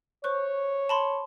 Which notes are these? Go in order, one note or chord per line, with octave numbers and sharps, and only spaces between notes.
C5 C#5 C#6 F#6
A5 B5 C6